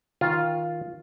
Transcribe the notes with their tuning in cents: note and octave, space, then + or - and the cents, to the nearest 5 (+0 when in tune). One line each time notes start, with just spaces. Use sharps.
D#3 +20 F4 +0